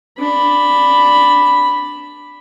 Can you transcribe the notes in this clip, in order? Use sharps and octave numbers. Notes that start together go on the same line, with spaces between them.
D4 B5